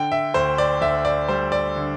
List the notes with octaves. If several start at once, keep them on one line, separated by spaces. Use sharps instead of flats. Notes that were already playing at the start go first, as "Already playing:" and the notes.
Already playing: D3 G5
E5
D2 C5
D5
D2 E5
D5
G3 C5
D5
D3